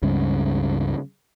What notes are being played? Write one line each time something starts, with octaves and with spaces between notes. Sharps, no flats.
C#2 G2 C#3